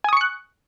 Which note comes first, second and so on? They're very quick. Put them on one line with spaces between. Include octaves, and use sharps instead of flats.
G#5 D#6 C#6 C#7 F#6